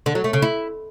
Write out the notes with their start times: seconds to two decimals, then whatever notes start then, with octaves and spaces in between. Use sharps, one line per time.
0.06 D3
0.15 F#3
0.24 A3
0.33 C#3
0.42 E4